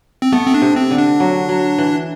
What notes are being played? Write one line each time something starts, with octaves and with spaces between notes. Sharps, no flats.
C4
A3 B3
C4
D4
C3
C4
D3
D4
F#3
F#3
E3